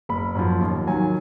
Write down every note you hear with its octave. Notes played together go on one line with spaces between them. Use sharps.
F#1 B5
F#2 F3
D#2
D#3 F#3 G#5